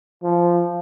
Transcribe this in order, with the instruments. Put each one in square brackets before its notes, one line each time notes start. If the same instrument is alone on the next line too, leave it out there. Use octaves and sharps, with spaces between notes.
[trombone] F3